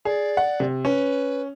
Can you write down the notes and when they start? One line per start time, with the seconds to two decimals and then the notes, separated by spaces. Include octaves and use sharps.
0.05 G#4 D5
0.37 F#5
0.60 C3
0.85 C#4 B4